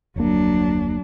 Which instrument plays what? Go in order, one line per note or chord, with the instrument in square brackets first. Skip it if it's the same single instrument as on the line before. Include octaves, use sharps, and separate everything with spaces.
[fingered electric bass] F1 D2 A#3 [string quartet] F#3 D4